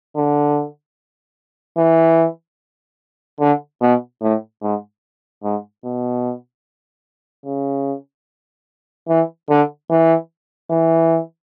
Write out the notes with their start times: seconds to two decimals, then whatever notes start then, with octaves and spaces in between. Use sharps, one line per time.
0.16 D3
1.78 E3
3.40 D3
3.81 B2
4.22 A2
4.62 G#2
5.44 G#2
5.84 B2
7.45 C#3
9.09 E3
9.50 D3
9.90 E3
10.70 E3